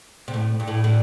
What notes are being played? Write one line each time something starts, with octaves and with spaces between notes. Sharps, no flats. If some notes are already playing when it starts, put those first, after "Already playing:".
C3
A2
G2
A2
A2 D3